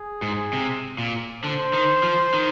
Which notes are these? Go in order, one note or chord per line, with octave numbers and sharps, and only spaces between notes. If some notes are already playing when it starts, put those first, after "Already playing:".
Already playing: G#4
G#2
C3
A#2
D3 C5
D#3
F3
D#3